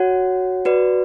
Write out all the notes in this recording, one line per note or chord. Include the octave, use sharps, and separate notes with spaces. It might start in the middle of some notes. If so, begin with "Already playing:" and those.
Already playing: F#4 C#5 F#5
F#4 B4 D5